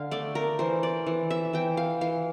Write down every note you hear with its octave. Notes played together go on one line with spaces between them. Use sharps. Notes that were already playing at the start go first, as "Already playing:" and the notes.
Already playing: D3 F5
A3 D5
A#4
E3 C5
D5
E3
E5
E3 G5
F5
E3 F5